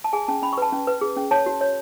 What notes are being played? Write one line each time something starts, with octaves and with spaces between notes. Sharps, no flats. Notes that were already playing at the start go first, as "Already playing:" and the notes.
A5
G#4 G#5
C#4 A5
C#4 B5
C#6
B4 A5
C#4
B4
G#4
C#4
C#5 A5
F#4
C#5